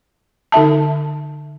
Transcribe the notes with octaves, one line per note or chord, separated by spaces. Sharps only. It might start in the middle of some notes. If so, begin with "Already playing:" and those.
D3 D#4 E5 A5